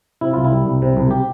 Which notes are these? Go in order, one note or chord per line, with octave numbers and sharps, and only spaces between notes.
C3 E4
C2 F4
E4
G3
C2
C3
C2
G4